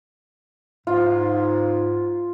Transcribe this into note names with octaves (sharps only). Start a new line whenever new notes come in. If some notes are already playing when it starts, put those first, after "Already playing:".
G#2 F4